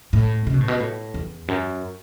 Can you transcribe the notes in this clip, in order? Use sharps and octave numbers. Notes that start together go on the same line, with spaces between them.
A2
C#3
B2
A2
B2
A2
E2
F#2